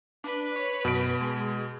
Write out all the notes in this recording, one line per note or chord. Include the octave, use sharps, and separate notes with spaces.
D4 B4
C#5
F#2 B2 D7
G#3